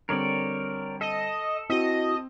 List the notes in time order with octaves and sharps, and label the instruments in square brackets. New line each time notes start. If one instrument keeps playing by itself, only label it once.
[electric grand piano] D3 G3 C4 [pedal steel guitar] A#4 C#5 D5
[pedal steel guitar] A4 [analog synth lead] D#5
[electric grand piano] C4 [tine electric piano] E4 F#4 [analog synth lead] D#5